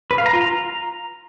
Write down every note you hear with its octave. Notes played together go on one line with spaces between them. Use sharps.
B4
F5
A#5
F4
A#5